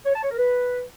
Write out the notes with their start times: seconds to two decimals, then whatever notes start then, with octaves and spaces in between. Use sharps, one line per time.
0.06 C#5
0.14 A5
0.22 C#5
0.30 A#4
0.38 B4